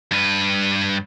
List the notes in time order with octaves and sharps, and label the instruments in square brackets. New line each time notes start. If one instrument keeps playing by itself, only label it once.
[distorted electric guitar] G2 B4